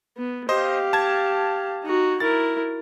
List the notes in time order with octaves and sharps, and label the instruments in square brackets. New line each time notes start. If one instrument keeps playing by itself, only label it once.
[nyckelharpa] B3
[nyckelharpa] G4 F5 [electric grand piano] C5 D#5
[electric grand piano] A5 G#6
[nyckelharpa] D#4 F#4
[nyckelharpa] E4 A#4 [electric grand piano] A6